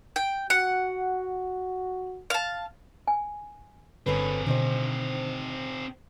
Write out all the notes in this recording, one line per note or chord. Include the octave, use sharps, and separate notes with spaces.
G5
F#4 F#5
F5 A5
G#5
G1 D3 C4 C#4 G#4 A4 B4
D2 B2 D3 D#3 C5